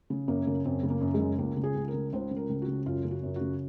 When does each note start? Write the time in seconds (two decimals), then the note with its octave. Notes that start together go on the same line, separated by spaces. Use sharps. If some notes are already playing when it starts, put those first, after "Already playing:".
0.10 C#3
0.28 F#2 A#3
0.47 C#3
0.65 F#2 C4
0.83 C#3
0.90 A#3
1.01 F#2
1.14 G#3
1.20 C#3
1.39 C#2 A#3
1.57 C#3
1.64 G#4
1.76 C#2
1.88 A#4
1.94 C#3
2.13 C#2 C5
2.31 C#3
2.36 A#4
2.49 C#2
2.62 F#4
2.68 C#3
2.86 F#2 F4
3.05 C#3
3.11 F#4
3.23 F#2
3.36 F#4
3.41 C#3